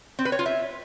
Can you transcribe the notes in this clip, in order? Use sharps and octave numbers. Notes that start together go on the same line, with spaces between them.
C4
B4
C#5
F4
E5